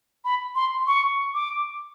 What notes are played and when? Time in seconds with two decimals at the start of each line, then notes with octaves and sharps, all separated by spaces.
0.25 B5
0.55 C6
0.87 C#6
1.34 D6